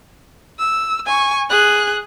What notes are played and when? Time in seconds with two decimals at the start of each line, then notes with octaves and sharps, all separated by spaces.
0.59 E6
1.06 G#5 C#6
1.50 G#4 F#6